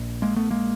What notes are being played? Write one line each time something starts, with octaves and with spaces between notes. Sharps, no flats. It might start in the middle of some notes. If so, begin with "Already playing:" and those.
Already playing: A#1
G#3 A#3
A3 B3
G#3 A#3